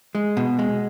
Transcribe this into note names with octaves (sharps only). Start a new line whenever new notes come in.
G#3
B2
G#3